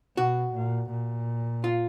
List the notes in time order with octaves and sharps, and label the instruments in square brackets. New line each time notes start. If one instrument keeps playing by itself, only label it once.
[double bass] B2 [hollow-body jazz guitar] F#4
[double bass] A#2
A#2
[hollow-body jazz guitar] F4